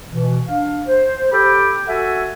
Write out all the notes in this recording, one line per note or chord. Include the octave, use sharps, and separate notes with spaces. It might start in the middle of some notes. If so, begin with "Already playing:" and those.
B2 E3
D4 F5
C5
G4 A4 G5 B5 D6
F#4 A4 E5 F#5 G#5